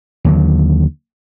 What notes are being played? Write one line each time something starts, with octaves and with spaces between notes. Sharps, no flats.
D#2 D3 F#3